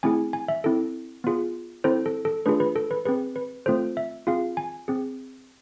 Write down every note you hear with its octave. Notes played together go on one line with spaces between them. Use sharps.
A3 C4 E4 G#4 G#5
G#5
E5
C4 E4 A4
B3 F4 G#4
C4 E4 A4 C5
A4
A4
A3 D4 F4 G#4 B4
B4
A4
B4
C4 G#4 B4
B4
A3 C4 F4 A4 C5
E5
C4 F4 G#4 F5
G#5
C4 G#4